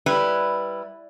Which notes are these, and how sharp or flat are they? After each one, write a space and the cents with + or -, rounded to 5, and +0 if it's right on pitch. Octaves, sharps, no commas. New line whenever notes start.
G3 +0 E4 +5 B4 +0